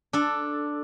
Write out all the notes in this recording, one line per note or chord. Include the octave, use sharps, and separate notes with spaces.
D4 A4